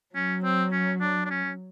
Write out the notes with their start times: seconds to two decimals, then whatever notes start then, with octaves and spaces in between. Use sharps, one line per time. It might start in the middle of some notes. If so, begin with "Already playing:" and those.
0.15 F#3 C#4
0.44 C4
0.72 C#4
1.01 D4
1.25 D4
1.31 C#4